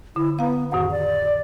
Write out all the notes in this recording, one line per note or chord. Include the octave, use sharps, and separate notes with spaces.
D3 E4
B3 F5 A#5
F2 A2 D#3 F#4
D5